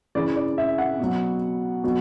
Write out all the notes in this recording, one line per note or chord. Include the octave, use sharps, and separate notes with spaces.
C#3 E3 D5
D5
E5
F#5
B2 F#3
B2 F#3